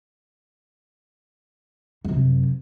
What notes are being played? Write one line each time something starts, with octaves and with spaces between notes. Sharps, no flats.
F#2 C3